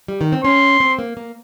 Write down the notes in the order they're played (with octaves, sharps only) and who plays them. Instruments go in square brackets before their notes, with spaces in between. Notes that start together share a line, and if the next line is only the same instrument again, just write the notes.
[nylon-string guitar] G3
D#3
C4
[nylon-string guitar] C#4 [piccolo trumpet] C6
[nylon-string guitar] C4
A#3
A#3